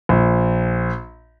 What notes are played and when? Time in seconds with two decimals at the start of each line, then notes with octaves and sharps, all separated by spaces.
0.09 A#1